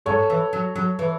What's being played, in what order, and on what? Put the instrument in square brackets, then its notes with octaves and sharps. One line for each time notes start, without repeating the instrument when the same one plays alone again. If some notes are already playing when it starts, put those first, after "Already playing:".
[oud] G#2 [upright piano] A4 C#5
[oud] E3
F#3
F#3
E3